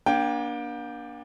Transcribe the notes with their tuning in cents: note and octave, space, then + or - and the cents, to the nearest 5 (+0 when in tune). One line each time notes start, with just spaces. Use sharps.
A#3 +40 D4 +0 G5 +0